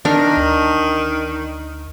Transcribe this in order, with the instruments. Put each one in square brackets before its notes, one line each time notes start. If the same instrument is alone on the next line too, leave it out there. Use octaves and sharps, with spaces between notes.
[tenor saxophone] D#3 [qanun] D4 A#4
[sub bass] D2